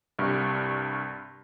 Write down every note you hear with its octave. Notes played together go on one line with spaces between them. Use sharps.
C2 G2